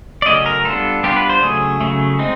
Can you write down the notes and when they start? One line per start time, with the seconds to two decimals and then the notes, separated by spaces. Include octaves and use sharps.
0.22 D5
0.26 C#3 F#3 A3 C#4 D#5
0.46 A#4
0.65 G3 B3 D4 F4 A4
1.03 G3 B3 D4 F4 G4
1.16 B4
1.29 C5
1.42 C#3 F#3 A3 G#4
1.81 C#3 F#3 A3
2.19 G#3 C4 D#4